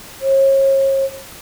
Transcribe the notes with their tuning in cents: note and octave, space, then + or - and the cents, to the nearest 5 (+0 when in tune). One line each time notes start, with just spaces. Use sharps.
C#5 -40